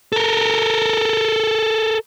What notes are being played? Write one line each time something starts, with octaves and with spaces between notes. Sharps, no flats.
A4 A#4